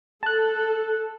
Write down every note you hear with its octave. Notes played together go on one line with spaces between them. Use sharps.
A4 A5 F#6